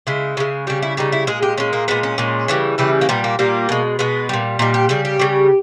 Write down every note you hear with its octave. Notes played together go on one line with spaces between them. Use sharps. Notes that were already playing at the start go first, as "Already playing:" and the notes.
C#3 G#3 E4
C#3 G#3
C#3 G3 G4
E4
C#3 G3 D#4
E4
A#2 G#3 G#4
G4
A#2 G#3 C#4
A#3
A#2 G#3 B3
C#4
A#2 G#3
C#3 E3 G3
C#3 E3 G3 E4
A#3
A#2 G3 B3
A#3
A#2 G3 A#3
B2 G#3
B2 G#3 B3
A#2 G3
A#2 G3 D#4
G4
C#3 G3 G#4
G4
C#3 G3